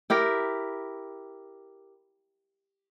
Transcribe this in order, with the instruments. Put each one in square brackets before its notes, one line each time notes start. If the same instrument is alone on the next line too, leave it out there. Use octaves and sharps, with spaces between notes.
[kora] E4 G4 A#4